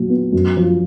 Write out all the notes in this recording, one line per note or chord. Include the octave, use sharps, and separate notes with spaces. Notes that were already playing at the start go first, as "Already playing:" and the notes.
Already playing: A#2 F#3
B3
F#2
F3